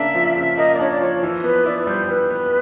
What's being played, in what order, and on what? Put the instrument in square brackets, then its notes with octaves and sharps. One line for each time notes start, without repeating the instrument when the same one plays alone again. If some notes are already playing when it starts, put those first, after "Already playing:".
Already playing: [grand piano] C#3 A#3 D4 [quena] E5
[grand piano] F3
[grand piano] C#3 [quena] E5
[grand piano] A#3 [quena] D#5
[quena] D5
[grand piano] D4 [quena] C#5
[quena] D5
[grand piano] F3 [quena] C#5
[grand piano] E3
[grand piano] B3 [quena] B4
[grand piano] E4 [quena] D5
[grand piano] G3 [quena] C5
[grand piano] E3 [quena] B4
[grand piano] B3